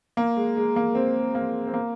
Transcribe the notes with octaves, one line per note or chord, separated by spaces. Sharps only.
A#3
G#3
G#3
A#3
C4
A#3
C4
A#3